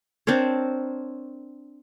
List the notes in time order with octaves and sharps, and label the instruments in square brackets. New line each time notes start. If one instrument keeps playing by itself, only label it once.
[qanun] C4 D4 A#4 C#5